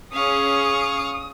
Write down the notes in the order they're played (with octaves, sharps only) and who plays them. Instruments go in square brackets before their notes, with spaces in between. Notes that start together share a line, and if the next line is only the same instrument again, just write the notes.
[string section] C#4 G#4 [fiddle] F5 C#6 [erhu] D#6